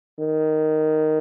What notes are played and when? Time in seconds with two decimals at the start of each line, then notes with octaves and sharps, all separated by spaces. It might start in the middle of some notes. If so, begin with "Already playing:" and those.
0.19 D#3